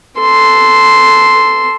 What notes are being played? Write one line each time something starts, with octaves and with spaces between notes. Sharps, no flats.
A4 C6